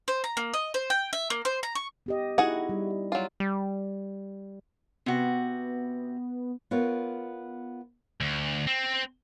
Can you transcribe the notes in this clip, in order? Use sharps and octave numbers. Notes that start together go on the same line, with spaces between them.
C5
A#5
A#3
D#5
C5
G5
E5
A#3
C5
A#5
C#6
B3 G4 D#5
D#4 E4 F#4 G#4 F#5
G3
F#3 F4
G3
C3 B3 F#4
B3 F4 A#4 C#5
D2
C4